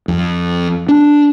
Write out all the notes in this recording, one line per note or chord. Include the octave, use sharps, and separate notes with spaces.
F2
D4